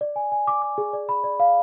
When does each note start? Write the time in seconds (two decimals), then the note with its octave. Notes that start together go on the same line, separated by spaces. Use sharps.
0.01 D5
0.16 G#5
0.32 G#5
0.47 D6
0.62 D6
0.78 G#4
0.93 D5
1.09 B5
1.24 D5
1.40 F5